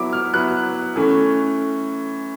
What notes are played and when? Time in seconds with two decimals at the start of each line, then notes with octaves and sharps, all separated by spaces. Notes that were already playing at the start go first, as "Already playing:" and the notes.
Already playing: F#3 B3 E4 D6
0.13 F6
0.33 F#3 B3 E4 F#6
0.96 E3 A3 C#4